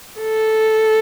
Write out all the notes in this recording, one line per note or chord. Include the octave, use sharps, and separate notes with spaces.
A4